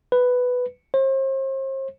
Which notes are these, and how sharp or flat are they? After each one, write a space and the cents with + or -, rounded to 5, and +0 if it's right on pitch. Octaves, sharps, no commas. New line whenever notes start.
B4 +5
C5 +40